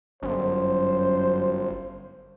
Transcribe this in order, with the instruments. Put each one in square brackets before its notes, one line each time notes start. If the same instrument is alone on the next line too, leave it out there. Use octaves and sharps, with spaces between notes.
[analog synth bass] G1 [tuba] F#2 [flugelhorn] C5